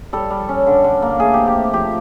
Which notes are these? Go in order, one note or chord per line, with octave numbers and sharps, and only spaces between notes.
G3 A4
G3
C#4
D3
D3
A#3
A3 G#4
C4 G4
G4
A3
F3 G4